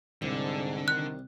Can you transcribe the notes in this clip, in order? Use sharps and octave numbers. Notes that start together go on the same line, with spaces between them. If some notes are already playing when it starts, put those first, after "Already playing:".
C2 G#2 D3
D#3 F#6